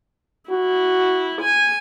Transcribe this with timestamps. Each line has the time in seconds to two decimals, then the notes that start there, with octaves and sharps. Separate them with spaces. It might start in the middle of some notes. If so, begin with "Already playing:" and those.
0.51 E4 F#4
1.41 G#5